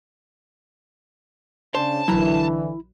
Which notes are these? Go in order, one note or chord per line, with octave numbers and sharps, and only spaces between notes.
C#3 D4 C5 A5
A#1 D3 E3 F#3 E4 A#5